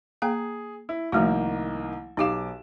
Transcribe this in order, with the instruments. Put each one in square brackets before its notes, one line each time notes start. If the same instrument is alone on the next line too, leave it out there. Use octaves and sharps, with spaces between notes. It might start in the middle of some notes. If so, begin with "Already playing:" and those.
[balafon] A#3 G5 A#5 [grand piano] G#4
[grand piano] E4
[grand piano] C2 D#3 A#3 [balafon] F3 A3 F#4
[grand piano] B1 D6 E7 [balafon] D#4 G4 F5